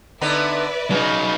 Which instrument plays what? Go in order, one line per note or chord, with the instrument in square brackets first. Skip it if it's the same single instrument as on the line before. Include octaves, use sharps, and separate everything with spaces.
[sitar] D3 B3 D#4 [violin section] B4 D5 E5
[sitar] C#3 [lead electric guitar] F#3 D#4